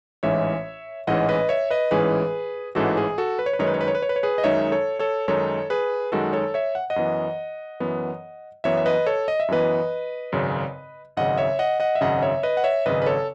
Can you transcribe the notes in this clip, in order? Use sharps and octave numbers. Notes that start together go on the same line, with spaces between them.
A1 G#2 E3 G#3 C#4 C#5 E5
A1 G#2 E3 G#3 C#4 D#5 F#5
B4 D#5
C#5 E5
B4 D#5
A1 G#2 E3 G#3 C#4 G#4 B4
A1 G#2 E3 G#3 C#4 F#4 A4
G#4
F#4 A4
B4
C#5
B4
F#2 D#3 G#3 D#4 C#5
B4
C#5
B4
C#5
B4
C#5
B4
C#5
G#4 B4
D#5
F#2 D#3 G#3 D#4 C#5 E5
A4 C#5
A4 C#5
F#2 D#3 G#3 D#4 A4 C#5
G#4 B4
F#2 D#3 G#3 D#4 F#4 A4
A4 C#5
C#5 E5
F#5
D#5 F#5
F#2 E3 B3
F#2 E3 B3
F#2 E3 B3 C#5 E5
E5
B4 D#5
A4 C#5
D#5
E5
F#2 E3 B3 B4 D#5
G#1 F#2 C#3
G#1 F#2 C#3 D#5 F#5
C#5 E5
D#5 F#5
D#5 F#5
E5
G#1 F#2 C#3 D#5 F#5
C#5 E5
B4 D#5
F#5
C#5 E5
G#1 F#2 C#3 B4 D#5
B4
A4 C#5